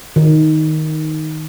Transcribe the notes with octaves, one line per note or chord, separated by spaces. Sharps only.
D#3